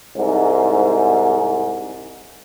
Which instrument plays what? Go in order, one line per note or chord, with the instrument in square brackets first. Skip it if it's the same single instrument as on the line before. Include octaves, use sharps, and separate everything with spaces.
[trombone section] C2 G#2